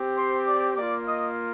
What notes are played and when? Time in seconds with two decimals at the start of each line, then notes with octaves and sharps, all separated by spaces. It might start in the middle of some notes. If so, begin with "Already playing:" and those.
Already playing: C4 G4
0.17 C5 C6
0.46 D5 D6
0.76 A#3 F4 D5 D6
1.07 D#5 D#6